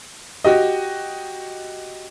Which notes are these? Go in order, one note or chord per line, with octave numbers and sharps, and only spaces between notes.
F#4 G4 D#5